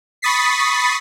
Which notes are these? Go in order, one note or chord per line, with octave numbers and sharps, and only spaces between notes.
B5 C#6 D#6 A6 B6 C7